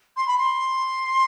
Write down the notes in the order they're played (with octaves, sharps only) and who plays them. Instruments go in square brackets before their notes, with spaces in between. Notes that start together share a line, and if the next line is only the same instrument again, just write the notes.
[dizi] C6
B5
C6